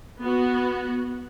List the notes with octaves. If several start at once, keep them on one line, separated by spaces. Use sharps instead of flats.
B3 F#4